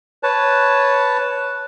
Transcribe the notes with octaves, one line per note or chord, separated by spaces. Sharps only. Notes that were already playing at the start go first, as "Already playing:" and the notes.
B4 C#5 A5